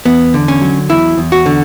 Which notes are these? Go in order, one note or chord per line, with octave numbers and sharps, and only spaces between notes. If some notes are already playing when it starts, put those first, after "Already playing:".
E2 B3
D3
C#4
F#3
E2 E4
E2
F#4
D3